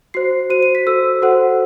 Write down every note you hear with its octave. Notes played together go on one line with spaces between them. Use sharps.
F#4 C5 C7
F#4 C5 D#7
D#7
B6
F#4 A4 C5 E6
F#4 A4 C5 F#5